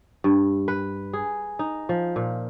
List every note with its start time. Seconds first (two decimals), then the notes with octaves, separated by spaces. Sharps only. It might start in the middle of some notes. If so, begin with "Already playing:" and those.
0.24 G2
0.68 B4
1.13 G#4
1.59 D#4
1.89 F3
2.16 A#2